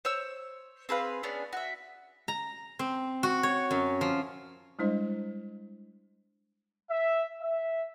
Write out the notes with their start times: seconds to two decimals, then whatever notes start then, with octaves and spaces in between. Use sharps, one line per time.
0.05 C5 C#5 E6
0.89 C4 G#4 B4 F5
1.23 B3 C#4 D4 G#4
1.53 F#4 E5
2.28 A#5
2.79 C4
3.23 F#4
3.43 C#5
3.71 F#2
4.01 F3
4.79 G3 G#3 D4 E4 C5 D#5
6.90 E5
7.41 E5